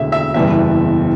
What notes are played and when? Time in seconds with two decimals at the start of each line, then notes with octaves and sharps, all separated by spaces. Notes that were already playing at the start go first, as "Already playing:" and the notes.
Already playing: E1 D2 D3 E5
0.12 E5
0.34 F#1 E2 B2 G3 E5